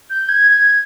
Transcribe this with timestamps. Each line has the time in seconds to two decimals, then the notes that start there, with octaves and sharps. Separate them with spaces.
0.10 G6
0.29 G#6
0.51 G#6